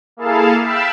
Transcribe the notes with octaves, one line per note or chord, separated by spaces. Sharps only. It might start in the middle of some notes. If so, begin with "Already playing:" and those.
A#3 E4 G#4 A4 F5 A5
E5 F5 G5 A5 B5 E6